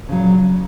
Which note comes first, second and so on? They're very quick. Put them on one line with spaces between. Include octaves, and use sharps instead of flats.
C#3 F#3 A#2